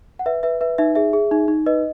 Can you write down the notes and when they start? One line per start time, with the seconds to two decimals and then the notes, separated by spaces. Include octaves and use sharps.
0.19 F#5
0.26 B4 E5
0.43 B4 E5
0.61 B4 E5
0.78 D#4 E5
0.95 G#4 E5
1.13 G#4
1.31 D#4
1.48 D#4
1.66 B4 D#5